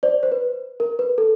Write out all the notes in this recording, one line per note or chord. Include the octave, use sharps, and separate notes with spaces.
C5 D5
C5
B4
A#4
B4
A4